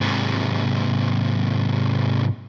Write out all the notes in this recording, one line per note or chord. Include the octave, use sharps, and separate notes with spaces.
G#2 C3